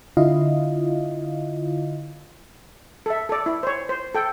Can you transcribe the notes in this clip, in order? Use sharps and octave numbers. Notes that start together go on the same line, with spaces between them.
D3 E4 F4 D#5 F5
A4 E5
A4 D5
E4
C5 C#5
C5
A4 G5